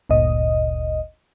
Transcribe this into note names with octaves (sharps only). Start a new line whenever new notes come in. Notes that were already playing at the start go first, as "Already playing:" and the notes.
G1 D2 A#2 D#5